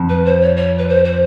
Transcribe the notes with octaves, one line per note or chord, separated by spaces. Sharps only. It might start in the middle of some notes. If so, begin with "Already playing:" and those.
Already playing: F2
B4
C5
C#5
C#5
B4
C5
C5